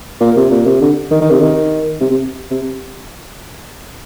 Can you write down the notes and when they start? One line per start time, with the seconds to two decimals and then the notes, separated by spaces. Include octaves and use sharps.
0.21 A#2
0.36 C3
0.51 A#2
0.66 C3
0.81 D3
1.11 D#3
1.21 D#3
1.30 C3
1.41 D#3
2.00 C3
2.10 C3
2.51 C3